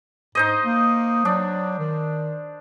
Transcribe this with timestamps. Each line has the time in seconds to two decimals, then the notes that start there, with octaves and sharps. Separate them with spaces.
0.35 G#2 D#4 C5 D#5
0.64 A#3
1.25 F#3 D4
1.79 D#3